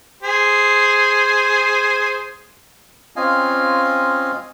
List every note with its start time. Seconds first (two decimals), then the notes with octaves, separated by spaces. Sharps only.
0.23 G#4 C5
3.16 C4 C#4 F4 D#5 F5 G#5